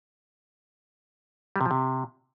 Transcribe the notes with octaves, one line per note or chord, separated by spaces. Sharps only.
G3
C3
F3
C3